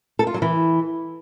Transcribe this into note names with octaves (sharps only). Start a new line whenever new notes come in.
A4
F4
F#3
E3